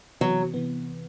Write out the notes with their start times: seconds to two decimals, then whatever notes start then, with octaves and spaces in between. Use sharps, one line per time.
0.21 C3 E3 F#3 B3
0.54 C3 E3 B3